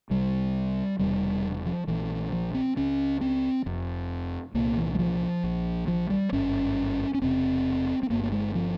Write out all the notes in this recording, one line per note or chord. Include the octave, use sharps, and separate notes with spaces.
C2 C3 G3
E1 E2 C3 G3
F3
A#1 A#2 E3
F3
C4
C#2 C#3 C#4
C4
F1 F2 C3
C2 A#2 A#3
E3
G3
F3
A#1 A#2
F3
G3
G#1 G2 C#4
C#4
E1 E2 C3 C4
C4
G1 G2 A#3
A#3
G#3
F3